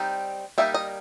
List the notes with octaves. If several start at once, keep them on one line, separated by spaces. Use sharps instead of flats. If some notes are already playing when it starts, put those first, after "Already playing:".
Already playing: G3 C4 D#4
G3 A#3 D#4 E5
D#5